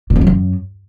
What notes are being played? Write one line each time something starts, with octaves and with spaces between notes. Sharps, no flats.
A#2
F2
F#3
F#2